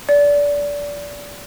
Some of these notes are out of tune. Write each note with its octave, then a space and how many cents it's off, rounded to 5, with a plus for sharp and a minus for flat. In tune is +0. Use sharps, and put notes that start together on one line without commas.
D5 -25